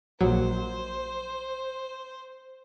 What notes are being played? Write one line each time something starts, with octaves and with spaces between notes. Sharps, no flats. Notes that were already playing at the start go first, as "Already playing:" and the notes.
A#1 F#3 C5